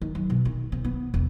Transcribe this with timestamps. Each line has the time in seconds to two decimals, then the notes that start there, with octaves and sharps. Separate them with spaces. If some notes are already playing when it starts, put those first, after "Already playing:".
0.01 D#3
0.15 F#3
0.30 B2
0.45 D#3
0.72 C4
0.85 B3
1.14 E1